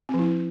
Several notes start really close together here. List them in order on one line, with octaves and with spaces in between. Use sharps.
C4 F3 E4